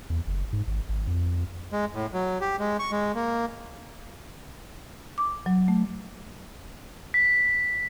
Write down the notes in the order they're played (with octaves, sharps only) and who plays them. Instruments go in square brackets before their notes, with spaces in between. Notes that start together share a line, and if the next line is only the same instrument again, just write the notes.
[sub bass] E2
F#1
G#2
G#1
G#1
F2
[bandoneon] G#3
A2
F#3
G4
G#3
C#6
G#3
A#3
[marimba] D6
F#3
A3
[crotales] B6